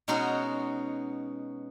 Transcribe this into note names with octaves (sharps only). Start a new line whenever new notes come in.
B2 G#3 C#4 D#4 F#4